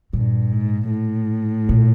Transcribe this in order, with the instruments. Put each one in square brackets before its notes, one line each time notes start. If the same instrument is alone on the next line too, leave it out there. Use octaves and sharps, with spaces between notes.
[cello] G2 [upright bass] A#2
[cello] G#2
A2
[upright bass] A#2